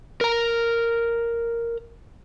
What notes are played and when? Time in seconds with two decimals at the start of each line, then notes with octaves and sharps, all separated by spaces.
0.21 A#4 A#5